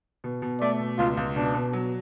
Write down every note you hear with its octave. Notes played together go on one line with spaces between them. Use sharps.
B2
B2
A3 D5
B2
C#2 F4
C#2
B2 D4
B2
F#3